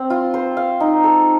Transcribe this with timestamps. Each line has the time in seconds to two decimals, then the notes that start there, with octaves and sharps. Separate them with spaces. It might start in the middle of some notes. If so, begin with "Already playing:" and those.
Already playing: C4
0.10 F4
0.34 C5
0.57 F5
0.80 D#4
1.04 A4